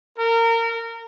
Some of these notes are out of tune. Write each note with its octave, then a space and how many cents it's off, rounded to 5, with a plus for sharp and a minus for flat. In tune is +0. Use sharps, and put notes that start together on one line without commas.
A#4 -25